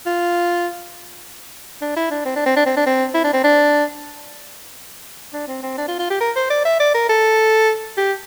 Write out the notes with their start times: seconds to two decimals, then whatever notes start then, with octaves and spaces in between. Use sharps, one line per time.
0.06 F4
1.82 D4
1.97 E4
2.11 D4
2.25 C4
2.36 D4
2.46 C4
2.56 D4
2.66 C4
2.77 D4
2.87 C4
3.14 E4
3.24 D4
3.33 C4
3.44 D4
5.34 D4
5.48 C4
5.63 C4
5.78 D4
5.88 F4
5.99 F4
6.10 G4
6.21 A#4
6.36 C5
6.50 D5
6.65 E5
6.80 D5
6.95 A#4
7.09 A4
7.97 G4